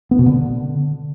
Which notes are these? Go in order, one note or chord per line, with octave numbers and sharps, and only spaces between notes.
B3
B2
D3